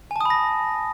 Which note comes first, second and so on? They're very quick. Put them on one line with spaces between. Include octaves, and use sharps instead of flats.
G#5 A5 D#6 B5 A#6